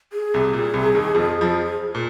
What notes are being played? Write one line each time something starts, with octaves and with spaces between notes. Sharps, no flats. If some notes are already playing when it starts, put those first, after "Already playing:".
G#4
C2 C3
A#2
C2 C3
D#2 D#3
F2 F3
F2 F3
A#2